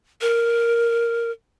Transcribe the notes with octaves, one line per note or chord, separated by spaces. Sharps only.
A#4